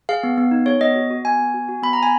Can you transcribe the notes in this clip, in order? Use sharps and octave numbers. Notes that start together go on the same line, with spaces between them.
G#4 F5
B3
B3
D#4
G#4 C#5
B3 D#5
F#4
F#4
B3 G#5
B3
F#4
F#4
B3 B5
B3 A#5
G#5